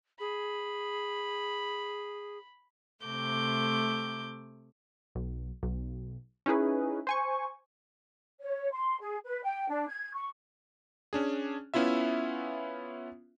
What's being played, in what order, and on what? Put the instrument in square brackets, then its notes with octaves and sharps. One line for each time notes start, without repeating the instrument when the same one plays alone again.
[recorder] G#4 [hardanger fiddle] B5
[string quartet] C3 A3 D6 G6
[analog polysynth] B1
B1
C#4 D#4 E4 G#4 B4
C5 G#5 C#6
[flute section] C#5
C6
G#4
B4
G5
D4
G#6
C#6
[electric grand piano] C#4 D4 G#4
B3 C#4 E4 F4 E5